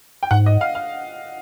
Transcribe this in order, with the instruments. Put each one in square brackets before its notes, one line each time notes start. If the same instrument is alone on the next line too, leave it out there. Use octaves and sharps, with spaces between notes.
[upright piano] G5
[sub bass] G#2 [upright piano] F#5
[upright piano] D#5
F5
F5